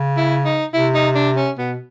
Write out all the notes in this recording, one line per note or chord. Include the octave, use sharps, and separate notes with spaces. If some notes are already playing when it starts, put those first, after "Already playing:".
Already playing: C#3
E4
D#4
C3 E4
D#4
D4
C#4
B2 B3